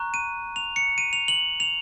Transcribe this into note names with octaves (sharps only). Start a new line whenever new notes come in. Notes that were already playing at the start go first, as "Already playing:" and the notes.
Already playing: A#5 C#6 F#6
D#7
F7
C#7
D#7
F7
F#7
F7